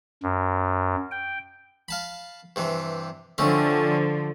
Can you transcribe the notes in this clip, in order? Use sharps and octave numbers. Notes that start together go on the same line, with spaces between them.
F#2
G5
F5 A5 B5
G2 C3 E3
D3 F3 A3 C4 C#4